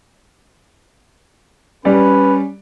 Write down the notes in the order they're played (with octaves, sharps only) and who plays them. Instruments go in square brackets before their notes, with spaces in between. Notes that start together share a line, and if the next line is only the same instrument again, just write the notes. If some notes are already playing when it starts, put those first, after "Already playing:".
[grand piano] G3 D5 [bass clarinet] C#4 [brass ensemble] B4